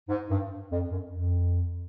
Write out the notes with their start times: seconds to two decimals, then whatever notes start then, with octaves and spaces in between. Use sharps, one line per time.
0.09 G#2
0.30 G2
0.71 F2
0.90 F#2
1.11 F2